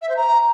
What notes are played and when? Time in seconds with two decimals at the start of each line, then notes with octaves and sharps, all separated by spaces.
0.02 E5
0.09 C5
0.16 A#5